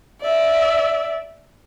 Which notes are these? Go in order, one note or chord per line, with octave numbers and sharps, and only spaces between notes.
D5 E5